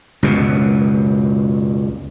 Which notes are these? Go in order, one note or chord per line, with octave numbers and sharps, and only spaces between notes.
C#2 F#2 B2